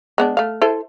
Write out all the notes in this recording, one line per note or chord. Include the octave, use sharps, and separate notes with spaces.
G#3 B3 D4
A3 F5
E4 A4 C5